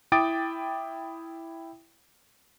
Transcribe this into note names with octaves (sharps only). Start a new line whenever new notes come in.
E4 G5 D6 D#6 A6 D7